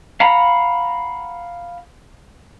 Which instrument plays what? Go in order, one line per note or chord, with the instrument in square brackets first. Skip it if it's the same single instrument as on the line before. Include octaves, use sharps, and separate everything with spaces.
[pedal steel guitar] F5 F#5 A#5 B5